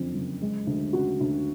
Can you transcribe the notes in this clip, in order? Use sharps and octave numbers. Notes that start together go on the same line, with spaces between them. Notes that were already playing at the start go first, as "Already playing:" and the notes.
Already playing: F#1 F2 D3
F#1
G#3
D2
C#3 F#4
D2